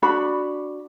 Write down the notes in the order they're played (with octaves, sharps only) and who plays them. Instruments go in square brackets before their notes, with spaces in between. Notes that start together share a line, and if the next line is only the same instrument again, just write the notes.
[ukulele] D4 F#4 B5